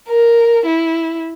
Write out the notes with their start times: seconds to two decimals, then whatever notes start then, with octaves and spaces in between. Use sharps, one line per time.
0.08 A#4
0.66 E4